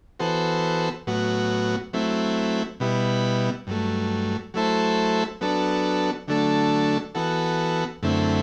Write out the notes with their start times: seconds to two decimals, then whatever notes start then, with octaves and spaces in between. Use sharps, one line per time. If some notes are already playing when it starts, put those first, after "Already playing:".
0.19 E3 B3 F#4 A4 C5
1.07 A2 F#3 B3 F#4
1.93 F#3 A3 C4 E4
2.80 B2 G3 B3 E4
3.67 G2 F#3 A3
4.54 F#3 A3 E4 A4 C5
5.41 F#3 B3 D4 A4
6.28 D3 F#3 A3 D4 A4
7.15 E3 B3 F#4 A4
8.03 F#2 D3 A3 C4 E4